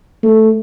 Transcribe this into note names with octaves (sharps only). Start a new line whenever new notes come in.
A3